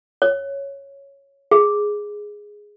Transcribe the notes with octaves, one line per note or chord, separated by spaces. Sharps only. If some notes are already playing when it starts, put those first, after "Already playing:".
C#5
G#4